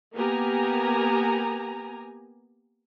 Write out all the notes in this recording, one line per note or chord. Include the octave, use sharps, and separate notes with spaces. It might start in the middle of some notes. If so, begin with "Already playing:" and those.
A#3 B3 G4 G#5 A#5